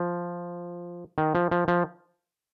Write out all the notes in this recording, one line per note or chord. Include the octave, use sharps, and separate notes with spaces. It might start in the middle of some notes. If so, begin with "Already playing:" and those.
Already playing: F3
D#3
F3
F3
F3